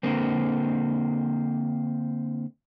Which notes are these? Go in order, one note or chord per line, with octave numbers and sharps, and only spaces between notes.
D3 A#3 C4